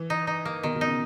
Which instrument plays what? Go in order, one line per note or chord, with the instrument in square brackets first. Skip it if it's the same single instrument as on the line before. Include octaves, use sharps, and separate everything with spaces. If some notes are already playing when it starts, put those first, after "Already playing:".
Already playing: [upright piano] E3
[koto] D#4
D#4
A#3
[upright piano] B2 [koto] D#3
[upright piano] B2
[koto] D#4
[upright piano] C#3